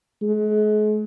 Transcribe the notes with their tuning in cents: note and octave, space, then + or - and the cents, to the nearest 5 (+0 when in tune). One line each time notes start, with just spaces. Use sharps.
G#3 +40